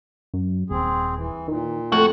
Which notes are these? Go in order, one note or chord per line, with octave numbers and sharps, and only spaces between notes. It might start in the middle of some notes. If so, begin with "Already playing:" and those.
F#2
D#1 C4 G#4
E3
A#2 D#3
F2 A3 F#4